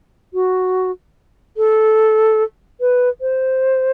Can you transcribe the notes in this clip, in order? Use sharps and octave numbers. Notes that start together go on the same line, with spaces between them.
F#4
A4
B4
C5